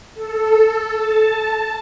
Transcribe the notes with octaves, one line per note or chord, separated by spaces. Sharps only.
A4
A5